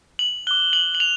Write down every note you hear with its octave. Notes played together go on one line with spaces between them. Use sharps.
F#7
D6 F#6 G7
F#7
F#7
F7